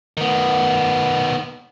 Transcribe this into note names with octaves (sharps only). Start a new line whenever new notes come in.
D#3 B3